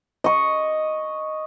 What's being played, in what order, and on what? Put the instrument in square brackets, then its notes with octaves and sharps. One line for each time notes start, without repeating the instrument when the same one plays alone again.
[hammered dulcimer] D#5 C#6